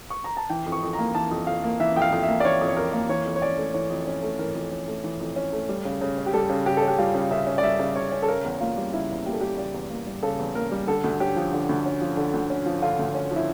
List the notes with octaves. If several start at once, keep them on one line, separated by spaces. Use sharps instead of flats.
C#6
A#5
A5
E3 G5
F2
C#6
F2
A#5
A#3
E3 A5
F2
F2 F5
A#3
E3 E5
F2 G5
F5
F2
E5
A#3
D5
E3 C#5
F2
C#5
F2 A#4
A#3
E3 C#5
F2
C#5
C#4 D5
A3
E3 C#5
F2
C#4
A3
E3 A#4
F2
C#4
A3
E3
F2
C#4
A3
G3
C#3
C#3
C#4
G4
G3 A4
C#3
C#3 G4
A4
C#4
G4
G3 F4
C#3
C#3 E5
C#4
D5
G3 E5
C#3
C#3 C#5
C#4
A4
C#3 A#4
E2
A#3 F4
G3
C#3 E4
E2
A#3 G4
A4
G3 G4
C#3 D5
E2
A#3
G3
C#3 A4
E2
A#3 A#4
G3
D3 A4
D2
C#4 G4
F3
D3
D2
C#4
F3
D3
D2
C#4
F3
D3 F4
D2
C#4
F3
E4